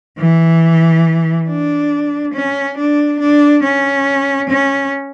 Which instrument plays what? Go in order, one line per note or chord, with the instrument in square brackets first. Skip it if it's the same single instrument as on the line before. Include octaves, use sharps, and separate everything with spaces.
[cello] E3
D4
C#4
D4
D4
C#4
C#4